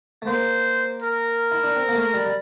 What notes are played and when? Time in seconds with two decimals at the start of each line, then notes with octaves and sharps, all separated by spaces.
0.22 A3
0.27 A#3 C5
1.02 A#4
1.52 E4
1.64 D4
1.76 C4
1.89 A#3
1.95 A3
2.14 G3
2.26 G3